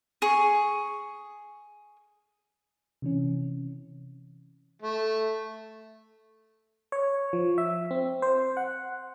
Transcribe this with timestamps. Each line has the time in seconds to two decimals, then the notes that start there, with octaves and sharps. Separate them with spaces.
0.22 G#4 C#6
3.02 C3 E3 C#4
4.82 A3
6.92 C#5
7.33 F3
7.58 E5
7.91 C4
8.22 C5
8.57 F#5